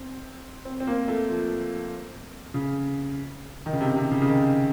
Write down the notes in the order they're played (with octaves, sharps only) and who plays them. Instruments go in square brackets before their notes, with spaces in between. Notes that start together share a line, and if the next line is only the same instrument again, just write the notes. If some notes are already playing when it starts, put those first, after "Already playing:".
Already playing: [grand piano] C4
C4
C4
A#3
A3
F3
C#3
D#3
C#3
C3
C3
C#3
C#3
D#3